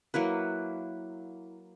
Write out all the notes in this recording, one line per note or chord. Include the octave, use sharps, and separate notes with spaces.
F#3 A#3 E4 B4